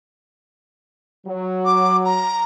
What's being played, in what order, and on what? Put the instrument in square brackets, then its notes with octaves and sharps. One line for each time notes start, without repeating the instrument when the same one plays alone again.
[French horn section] F#3
[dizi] D6
A#5